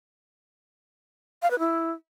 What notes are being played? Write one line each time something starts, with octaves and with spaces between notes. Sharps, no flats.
F5
B4
E4